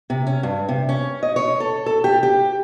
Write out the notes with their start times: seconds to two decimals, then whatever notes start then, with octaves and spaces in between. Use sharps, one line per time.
0.10 C3
0.27 C#4
0.43 G2
0.69 C3
0.89 C#4
1.23 D#5
1.36 C#5
1.60 A4
1.86 A4
2.04 G4
2.23 G4